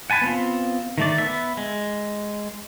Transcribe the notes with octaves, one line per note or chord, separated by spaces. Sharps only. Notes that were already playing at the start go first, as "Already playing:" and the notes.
F#5 G#5 A5 B5
B3 C4 F4
D#3 A3 D5
B3 E5
G#3